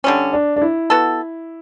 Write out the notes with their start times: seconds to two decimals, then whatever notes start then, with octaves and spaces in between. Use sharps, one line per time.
0.04 D3 G3 C#4
0.33 D4
0.56 D4
0.62 E4
0.90 B3 F#4 A4